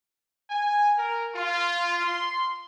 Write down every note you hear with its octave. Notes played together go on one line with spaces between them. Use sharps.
G#5
A#4
F4
C6